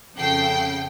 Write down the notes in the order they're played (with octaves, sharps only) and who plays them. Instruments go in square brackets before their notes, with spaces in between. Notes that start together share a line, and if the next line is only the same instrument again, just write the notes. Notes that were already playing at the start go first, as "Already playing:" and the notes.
[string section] F2 C#3 A4 G5 C7